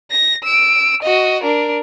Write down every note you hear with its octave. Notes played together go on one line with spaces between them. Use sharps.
A#6
E6 D7
F#4 D#5
D4 A#4